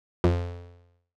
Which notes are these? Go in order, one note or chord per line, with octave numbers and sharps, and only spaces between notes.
F2